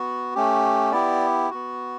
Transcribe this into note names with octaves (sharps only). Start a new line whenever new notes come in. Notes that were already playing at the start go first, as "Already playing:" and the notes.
Already playing: B3 F#4
A3 C#4 G4
B3 E4 G4 D5
B3 F#4